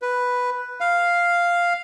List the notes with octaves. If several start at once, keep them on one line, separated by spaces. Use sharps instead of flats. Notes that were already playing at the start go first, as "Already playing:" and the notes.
B4
F5